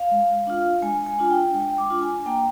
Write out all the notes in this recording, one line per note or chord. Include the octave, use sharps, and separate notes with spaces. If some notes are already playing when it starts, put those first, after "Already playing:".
Already playing: F5
G#3
D4 F4
G#3 G#5
G#5
D4 F4
G5
G#3 G5
D6
D4 F4
G#5
A#3 G5